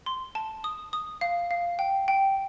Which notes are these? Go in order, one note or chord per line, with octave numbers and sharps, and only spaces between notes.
C6
A5
D#6
D#6
F5
F5
G5
G5